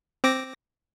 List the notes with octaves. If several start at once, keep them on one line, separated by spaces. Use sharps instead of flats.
C4 D6 A#6